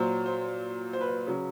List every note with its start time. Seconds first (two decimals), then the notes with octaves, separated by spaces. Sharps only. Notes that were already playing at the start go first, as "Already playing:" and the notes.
Already playing: A#2 F#3 C5
0.26 C5
0.93 C5
1.01 B4
1.08 C5
1.27 C#3 F#3